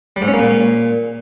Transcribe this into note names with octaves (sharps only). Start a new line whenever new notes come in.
G3
G#2
C#4
A#3
A#2